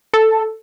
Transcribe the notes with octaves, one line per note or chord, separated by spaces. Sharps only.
A4